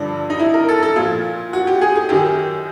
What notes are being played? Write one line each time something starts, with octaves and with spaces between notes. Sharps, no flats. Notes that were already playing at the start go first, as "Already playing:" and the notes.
Already playing: G2 D3 F3 D4
D#4
E4
A#4
A4
A4
A#2 F3 F4
F#4
G4
G#4
G#4
F#2 D#3 F#3 G4